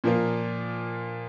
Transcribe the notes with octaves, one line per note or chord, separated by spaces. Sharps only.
A#2 F3 A#3 F4